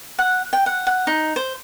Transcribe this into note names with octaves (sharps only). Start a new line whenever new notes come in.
F#5
G5
F#5
F#5
D#4
C5